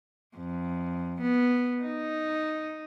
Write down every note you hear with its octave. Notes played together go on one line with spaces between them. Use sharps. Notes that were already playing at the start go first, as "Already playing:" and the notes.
F2
B3
D#4